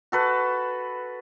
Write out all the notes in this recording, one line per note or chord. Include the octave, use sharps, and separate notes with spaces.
F#4 A4 B4